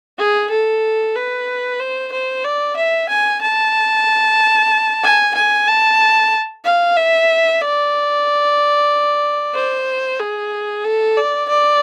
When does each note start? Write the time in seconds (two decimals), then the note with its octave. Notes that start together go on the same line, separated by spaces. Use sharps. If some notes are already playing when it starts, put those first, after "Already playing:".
0.18 G#4
0.50 A4
1.15 B4
1.80 C5
2.12 C5
2.44 D5
2.76 E5
3.09 G#5
3.42 A5
5.03 G#5
5.35 G#5
5.68 A5
6.65 F5
6.97 E5
7.61 D5
9.55 C5
10.19 G#4
10.84 A4
11.17 D5
11.49 D5